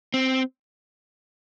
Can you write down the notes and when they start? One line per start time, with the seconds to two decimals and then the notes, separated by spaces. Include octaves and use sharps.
0.14 C4